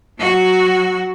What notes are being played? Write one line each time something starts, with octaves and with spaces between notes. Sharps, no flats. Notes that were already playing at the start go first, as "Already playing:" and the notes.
F#3 F#4